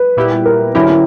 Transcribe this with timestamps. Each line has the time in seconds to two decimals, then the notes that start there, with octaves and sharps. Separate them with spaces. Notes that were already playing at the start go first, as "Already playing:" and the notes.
Already playing: B4
0.17 A#2 G3 B3 E4 G4
0.46 A#4
0.75 D3 F#3 C#4 E4 G4 A#4
0.90 E4